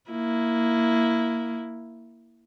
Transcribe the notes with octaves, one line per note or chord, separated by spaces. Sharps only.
A#3 E4